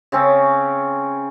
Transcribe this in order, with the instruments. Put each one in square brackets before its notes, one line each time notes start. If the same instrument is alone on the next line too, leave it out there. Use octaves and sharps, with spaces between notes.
[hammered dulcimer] C#3 C4 C#4